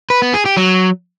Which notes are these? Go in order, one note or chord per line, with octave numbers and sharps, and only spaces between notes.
B4
B3
G#4
G4
F#3